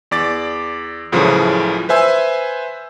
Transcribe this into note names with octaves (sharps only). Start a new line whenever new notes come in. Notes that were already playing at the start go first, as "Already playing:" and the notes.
E2 D5 D6 A6
C#2 F#2 A2 C#3 E3 F3
B4 C5 E5 G#5 E6